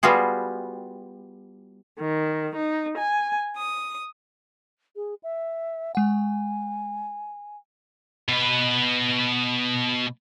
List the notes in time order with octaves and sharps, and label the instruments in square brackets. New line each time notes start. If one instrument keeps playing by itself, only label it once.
[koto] G3 B3 F4 F#4 G#4
[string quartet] D#3
D#4
G#5
D#6
[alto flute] G#4
E5
[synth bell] G#3 F#5 [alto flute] G#5
[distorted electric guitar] B2 B4